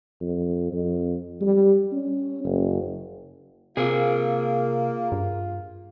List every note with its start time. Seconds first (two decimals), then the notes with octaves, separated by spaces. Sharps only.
0.21 F2
0.72 F2
1.41 G3
1.92 C#4
2.44 F#1
3.77 C3 A#3 F4 G#4 A#4
5.12 G2